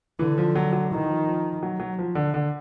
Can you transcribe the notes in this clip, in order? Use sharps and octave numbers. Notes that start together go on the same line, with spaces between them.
D3 E3
F3
F#3
F#3
D#3 E3
F3
F3
F#3
F#3
F3
D3
D3